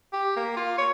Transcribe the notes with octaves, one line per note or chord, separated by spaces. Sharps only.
G4
A#3
F4
C#5